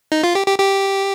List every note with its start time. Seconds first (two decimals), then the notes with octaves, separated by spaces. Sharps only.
0.12 D#4
0.24 F4
0.35 G4
0.47 G4
0.59 G4